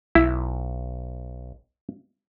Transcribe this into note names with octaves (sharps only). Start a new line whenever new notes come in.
B1 E4